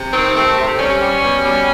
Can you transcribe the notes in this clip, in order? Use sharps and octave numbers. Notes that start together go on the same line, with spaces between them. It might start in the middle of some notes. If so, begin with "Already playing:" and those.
Already playing: C3
D#3 C4
A3
C3
G3 C#4
G3
B2
G3